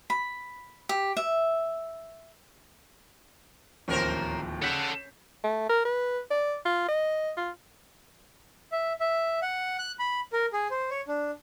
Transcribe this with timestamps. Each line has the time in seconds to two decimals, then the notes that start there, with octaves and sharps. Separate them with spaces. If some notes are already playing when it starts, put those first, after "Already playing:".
0.10 B5
0.89 G4
1.17 E5
3.88 D1 D#2 F3 C#4 A#4 C5
4.62 C#3 A4 F#5 G6 B6
5.44 A3
5.69 A#4
5.85 B4
6.30 D5
6.65 F4
6.88 D#5
7.37 F4
8.72 E5
9.00 E5
9.42 F#5
9.79 F#6
9.99 B5
10.33 A#4
10.53 G#4
10.71 C5
10.90 C#5
11.08 D4